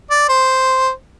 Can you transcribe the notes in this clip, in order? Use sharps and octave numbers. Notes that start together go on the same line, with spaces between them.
D5
C5